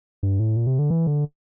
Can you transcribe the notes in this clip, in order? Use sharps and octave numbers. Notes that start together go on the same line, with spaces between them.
G2
A2
A#2
C3
D3
E3
D3